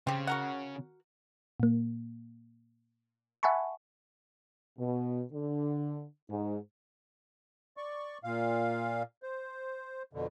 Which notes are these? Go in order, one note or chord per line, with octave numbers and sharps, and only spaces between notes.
C#3 C4 G4
F#4 A#4 F#5
A#2 A#3
E5 F#5 G#5 A5 B5 C#6
B2
D3
G#2
D5 C#6
A#2 F5
C5
F2 B2 D3